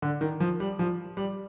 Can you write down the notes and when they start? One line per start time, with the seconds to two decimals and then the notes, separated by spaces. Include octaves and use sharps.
0.02 D3
0.21 D#3
0.40 F3
0.60 G3
0.79 F3
1.17 G3